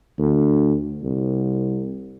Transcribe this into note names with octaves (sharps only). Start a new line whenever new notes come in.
D2
C2